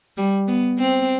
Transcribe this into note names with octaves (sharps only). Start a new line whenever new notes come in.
G3
B3
C4